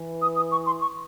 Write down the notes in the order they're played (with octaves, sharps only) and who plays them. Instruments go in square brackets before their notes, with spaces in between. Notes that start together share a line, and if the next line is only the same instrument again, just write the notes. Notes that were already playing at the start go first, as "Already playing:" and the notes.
Already playing: [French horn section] E3
[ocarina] D#6
D#6
C#6
C6
C#6